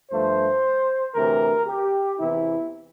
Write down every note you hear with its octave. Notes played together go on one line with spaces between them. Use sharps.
G2 F3 A3 C5
D2 C3 E3 A#4
G4
E2 C3 E3 E4